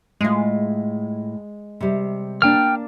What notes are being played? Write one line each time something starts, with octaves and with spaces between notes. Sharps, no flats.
A2 G#3 F4
C3 G3
A#3 D4 G5 F6 A6